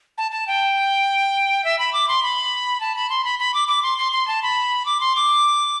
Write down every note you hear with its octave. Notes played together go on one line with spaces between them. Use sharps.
A5
A5
G5
E5
B5
D6
C6
B5
A5
B5
C6
B5
B5
D6
D6
C6
C6
C6
A5
B5
D6
C6
D6